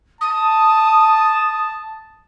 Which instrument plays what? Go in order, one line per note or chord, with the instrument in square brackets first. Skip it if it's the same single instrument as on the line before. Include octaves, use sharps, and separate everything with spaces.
[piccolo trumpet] A5 [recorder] D#6